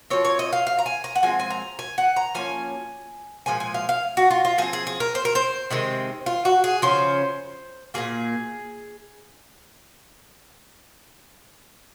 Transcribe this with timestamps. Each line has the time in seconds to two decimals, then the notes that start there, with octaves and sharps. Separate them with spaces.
0.10 F3 C4 C#5
0.25 C#5
0.39 D#5
0.53 F5
0.67 F5
0.79 A#5
0.86 G#5
1.04 A#5
1.15 F#5
1.23 F3 G#3 C4 G#5
1.39 G#5
1.50 A#5
1.79 G#5
1.98 F#5
2.16 A#5
2.35 F3 A#3 C#4 G#5
3.46 A#2 F3 G#3 G#5
3.60 G#5
3.74 F5
3.89 F5
4.17 F#4
4.30 F4
4.45 F4
4.58 F3 C4 G#4
4.73 G#4
4.87 G#4
5.00 A#4
5.15 C5
5.25 A#4
5.35 C5
5.70 C3 D#3 G#3 C4
6.26 F4
6.45 F#4
6.64 G#4
6.82 C#3 F3 C#4 C5
7.94 A#2 F3 A#3 G#4